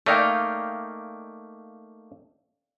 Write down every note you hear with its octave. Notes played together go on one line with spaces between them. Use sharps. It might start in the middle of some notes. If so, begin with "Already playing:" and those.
A3 A#3 D#4 D5 F5 G5